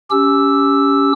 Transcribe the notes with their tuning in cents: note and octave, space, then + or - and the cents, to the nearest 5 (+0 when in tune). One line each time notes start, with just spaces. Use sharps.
C#4 +20 G4 +0 E6 +0